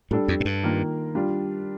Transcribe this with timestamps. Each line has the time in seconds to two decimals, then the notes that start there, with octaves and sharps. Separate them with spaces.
0.11 A2 G3 D4 A4
0.28 F2
0.40 A2
0.45 G2
0.63 D#3 A#3 F4 A#4
1.15 G3 D4 F4